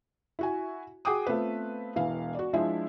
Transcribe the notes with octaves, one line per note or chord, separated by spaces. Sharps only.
E4 F#4 G#5
F#4 G#4 F#5 G5 D6 D#6
A3 B3 C4 F4 B4
E1 E3 F5
F#4 D5
F3 G#3 D4 E4 E5